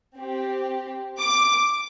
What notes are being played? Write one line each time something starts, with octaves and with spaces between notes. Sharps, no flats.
C4 G4
D6